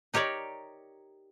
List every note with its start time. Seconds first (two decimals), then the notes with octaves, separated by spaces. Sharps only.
0.14 D#4 G4 A#4 C#5 D5